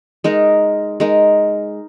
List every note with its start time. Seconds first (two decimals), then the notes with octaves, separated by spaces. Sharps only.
0.24 G#3 D#4 A#4
1.00 G#3 D#4 A#4